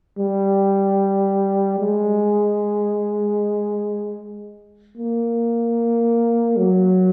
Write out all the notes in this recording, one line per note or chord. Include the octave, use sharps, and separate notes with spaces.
G3
G#3
A#3
F#3